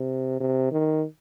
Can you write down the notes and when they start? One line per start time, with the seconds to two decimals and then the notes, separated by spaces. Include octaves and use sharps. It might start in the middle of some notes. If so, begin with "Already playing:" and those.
Already playing: C3
0.40 C3
0.72 D#3